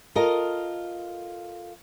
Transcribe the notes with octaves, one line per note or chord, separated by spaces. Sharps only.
F4 A4 A#4 D#5